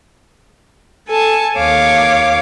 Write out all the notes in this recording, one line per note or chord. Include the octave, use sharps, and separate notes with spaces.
A4 G#5 A5
D#2 C#5 F5 D6